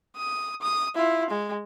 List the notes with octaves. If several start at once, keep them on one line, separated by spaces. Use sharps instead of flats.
D#6
D#6
E4 F4
G#3